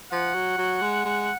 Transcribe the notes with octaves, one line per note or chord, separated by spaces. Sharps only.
F3 F#5
F#3
F#3
G#3
G#3